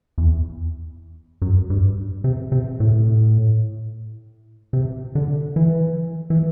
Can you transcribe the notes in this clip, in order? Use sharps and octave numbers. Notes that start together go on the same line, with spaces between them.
E2
F#2
G2
C3
C3
A2
C3
D3
E3
E3